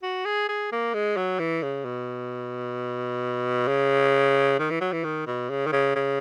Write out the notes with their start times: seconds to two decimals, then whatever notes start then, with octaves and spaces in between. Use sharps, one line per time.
0.03 F#4
0.25 G#4
0.49 G#4
0.72 A#3
0.94 G#3
1.17 F#3
1.40 E3
1.63 C#3
1.85 B2
3.68 C#3
4.59 D#3
4.70 E3
4.81 F#3
4.93 E3
5.04 D#3
5.27 B2
5.50 C#3
5.67 D#3
5.72 C#3
5.96 C#3